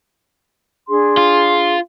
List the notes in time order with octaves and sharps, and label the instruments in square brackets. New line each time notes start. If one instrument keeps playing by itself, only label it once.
[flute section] D4 G#4 C6
[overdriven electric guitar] F4